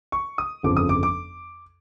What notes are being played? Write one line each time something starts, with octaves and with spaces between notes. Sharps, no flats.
C#6
D#6
G1 F2 C#3 F3 D6
D#6
D6
D6